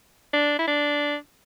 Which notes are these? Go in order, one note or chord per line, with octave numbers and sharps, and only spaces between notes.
D4
E4
D4